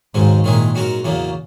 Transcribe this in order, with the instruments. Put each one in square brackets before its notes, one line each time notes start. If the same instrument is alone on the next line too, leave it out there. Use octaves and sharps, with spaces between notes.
[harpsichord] D#2 C#3 F#3 C#4 [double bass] G#2
[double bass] A#2 [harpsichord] D#3 G#3 C#4 E4 G#4
[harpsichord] G#2 F#3 C#4 F#4 A#4
E2 C#3 F#3 A#3